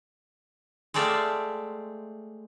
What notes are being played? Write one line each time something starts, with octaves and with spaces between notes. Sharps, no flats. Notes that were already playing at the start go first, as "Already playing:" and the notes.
G#3 A3 C4 D5 E5 F5